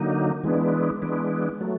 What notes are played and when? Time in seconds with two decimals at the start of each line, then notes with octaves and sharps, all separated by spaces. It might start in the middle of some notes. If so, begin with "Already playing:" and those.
Already playing: D3 F#3 A#3 D#4
0.44 E3 G#3 B3 D4
1.02 E3 G#3 B3 D4
1.61 F#3 A3